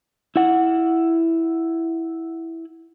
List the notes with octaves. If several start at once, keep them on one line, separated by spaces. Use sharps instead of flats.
E4 F#5